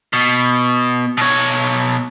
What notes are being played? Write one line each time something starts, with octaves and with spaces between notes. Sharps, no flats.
B2
B2 C#5